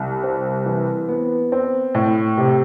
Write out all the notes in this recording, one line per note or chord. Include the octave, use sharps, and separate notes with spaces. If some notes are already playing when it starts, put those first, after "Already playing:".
Already playing: C2
C4
E3
B3
C4
A2
C3